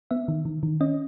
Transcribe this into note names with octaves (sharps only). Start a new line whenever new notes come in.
B3 E5
D#3
D#3
D#3
C#4 D#5